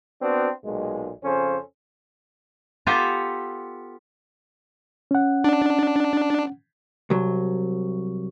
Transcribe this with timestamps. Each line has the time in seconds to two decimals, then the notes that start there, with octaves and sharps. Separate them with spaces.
0.22 B3 C4 D4 F#4
0.65 B1 A#2 G#3
1.24 F2 C#3 C#4 A4 C5
2.87 B3 F4 G4 A4 G#5 A#5
5.11 C#4 F#5
5.44 D4
7.10 C2 F#3